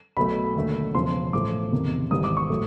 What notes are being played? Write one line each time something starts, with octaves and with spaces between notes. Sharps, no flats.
B1 B2 F#3 A3 B5
D#2 D3 F#3 A3
E1 E2 C#3 F3 C6
A1 A2 F3 A3 D6
F#1 E2 C3 D#3
G#1 G#2 E3 G3 D#6
D6
C#6
A2 F#3 A3